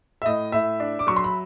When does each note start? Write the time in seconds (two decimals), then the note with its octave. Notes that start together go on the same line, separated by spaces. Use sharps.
0.22 E5
0.26 A2 D#5
0.52 A2 E5
0.80 D4
0.99 D6
1.07 F#3 C#6
1.16 C6
1.24 B5